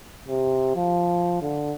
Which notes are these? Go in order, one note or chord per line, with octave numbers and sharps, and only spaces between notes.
C3
F3
D3